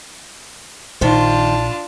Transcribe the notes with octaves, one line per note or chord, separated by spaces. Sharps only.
A#1 D#3 D4 F4 C5 A5